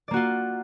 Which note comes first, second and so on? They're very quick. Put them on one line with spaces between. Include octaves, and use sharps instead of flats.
D5 A#3 F#4 F4